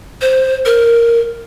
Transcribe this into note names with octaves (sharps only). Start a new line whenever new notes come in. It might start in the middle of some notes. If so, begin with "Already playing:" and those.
C5
A#4